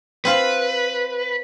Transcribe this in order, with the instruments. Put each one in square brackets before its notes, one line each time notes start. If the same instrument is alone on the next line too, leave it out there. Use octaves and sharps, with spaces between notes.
[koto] C4 F4 C5 [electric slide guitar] B4